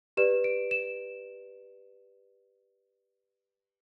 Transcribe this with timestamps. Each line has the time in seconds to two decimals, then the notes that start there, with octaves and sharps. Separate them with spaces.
0.17 G4 B4 D5 E7
0.44 D7
0.71 E7